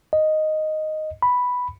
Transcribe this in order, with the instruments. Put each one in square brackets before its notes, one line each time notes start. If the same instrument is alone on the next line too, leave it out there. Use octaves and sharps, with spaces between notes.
[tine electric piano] D#5
B5